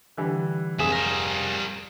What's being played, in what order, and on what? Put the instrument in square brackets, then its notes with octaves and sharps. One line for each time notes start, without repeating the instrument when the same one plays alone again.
[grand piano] D3 E3 G3
[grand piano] F1 G#4 D#6 [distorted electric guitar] C2 E5
[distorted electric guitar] G3 A#4